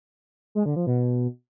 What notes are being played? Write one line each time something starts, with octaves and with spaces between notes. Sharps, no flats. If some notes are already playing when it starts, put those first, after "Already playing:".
G#3
D3
F3
B2